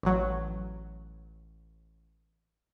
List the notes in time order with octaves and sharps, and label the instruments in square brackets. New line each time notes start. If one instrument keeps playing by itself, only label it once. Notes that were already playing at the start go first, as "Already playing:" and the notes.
[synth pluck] A1 F#3